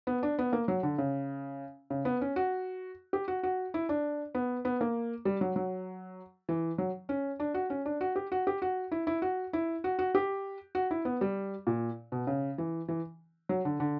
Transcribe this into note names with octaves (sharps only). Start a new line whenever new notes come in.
B3
D4
B3
A#3
F#3
D3
C#3
C#3
B3
C#4
F#4
G4
F#4
F#4
E4
D4
B3
B3
A#3
G3
F#3
F#3
E3
F#3
C#4
D4
F#4
C#4
D4
F#4
G4
F#4
G4
F#4
E4
E4
F#4
E4
F#4
F#4
G4
F#4
E4
B3
G3
A#2
B2
C#3
E3
E3
F#3
D3
D3